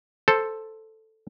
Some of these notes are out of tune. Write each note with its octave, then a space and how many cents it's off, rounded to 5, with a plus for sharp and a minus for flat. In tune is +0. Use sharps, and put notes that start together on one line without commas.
A4 +0 C5 +5